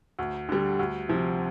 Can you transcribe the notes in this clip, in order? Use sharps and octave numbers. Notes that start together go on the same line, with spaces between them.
D2
D3 G3
D2
C3 F3